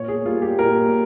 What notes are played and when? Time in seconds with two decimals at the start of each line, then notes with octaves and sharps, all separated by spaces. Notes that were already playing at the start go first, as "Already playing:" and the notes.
Already playing: A#2 C#5
0.08 G#4
0.25 G3 A#3 F4
0.42 G4
0.59 A#2 A#4